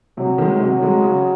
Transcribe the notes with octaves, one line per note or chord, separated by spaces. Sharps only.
C3 F#3
D#3 G#3
C3 F#3
D#3 G#3
C#3